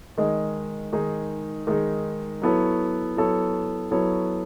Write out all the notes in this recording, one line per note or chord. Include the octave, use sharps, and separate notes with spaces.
D#3 G#3 D#4 G#4
D#3 G#3 D#4 G#4
D#3 G#3 D#4 G#4
F#3 B3 E4 A4 C#5
F#3 B3 E4 A4 C#5
F#3 B3 E4 A4 C#5